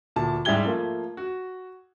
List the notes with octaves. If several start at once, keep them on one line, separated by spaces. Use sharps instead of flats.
D2 A#2 A5
G#2 G3 E4 G4 G#6 G7
F3 A3 A#3 F4
F#4